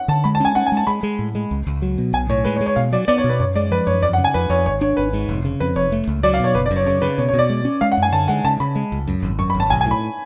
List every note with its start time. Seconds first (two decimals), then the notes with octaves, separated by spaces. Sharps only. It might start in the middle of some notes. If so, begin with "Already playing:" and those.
Already playing: F#5
0.08 D3 A5
0.24 G#3 B5
0.35 A5
0.40 C#4 G#5
0.55 C#4 F#5
0.66 G#5
0.72 G#3
0.77 A5
0.87 G#3 B5
1.03 G#3
1.19 A2
1.35 G#3
1.51 C#2
1.67 C#2
1.82 F#3
1.98 B2
2.13 B1 G#5
2.30 A2 C#5
2.45 G#3 B4
2.56 C#5
2.61 G#3
2.66 C#5
2.76 B2 F5
2.92 F#3 D5
3.08 B3 D5
3.18 C#5
3.24 B2
3.29 B4
3.40 F#2 C#5
3.56 G#3 D5
3.71 F3 B4
3.87 F#2 C#5
4.02 F2 D5
4.13 F#5
4.18 C#3
4.24 G#5
4.34 F2 B4
4.50 F2 C#5
4.66 G#1 C#5
4.81 D4 C#5
4.97 G#1 B4
5.13 G#2
5.29 F1
5.45 C#3
5.60 F2 B4
5.76 F1 C#5
5.92 A3
6.07 C#2
6.23 F#3 D5
6.34 F5
6.40 B2 C#5
6.55 F#1 B4
6.66 D5
6.71 F#2
6.76 C#5
6.86 C#3 C#5
7.02 C#3 B4
7.18 B2 C#5
7.29 C#5
7.34 B2
7.39 D5
7.50 G#3
7.65 C#4
7.81 G#3 F5
7.92 F#5
7.97 F#2
8.02 G#5
8.12 D3 A5
8.28 G#3 F#5
8.44 C#3 A5
8.60 C#3 B5
8.76 G#3
8.92 C#2
9.08 F#2
9.23 G#1
9.39 F#2 C#6
9.50 B5
9.55 G#1
9.60 A5
9.70 B1 G#5
9.81 G#5
9.86 A2
9.91 B5